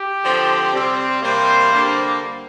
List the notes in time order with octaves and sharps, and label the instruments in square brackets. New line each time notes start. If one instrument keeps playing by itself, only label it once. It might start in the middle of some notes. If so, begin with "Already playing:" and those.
Already playing: [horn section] G4
D3 F3 C4
C3 G3 C4
C3 G3 A#3 C5
D3 G3 A#3